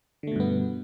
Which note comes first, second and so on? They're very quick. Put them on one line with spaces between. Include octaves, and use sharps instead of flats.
D3 A3 B2 G2 B3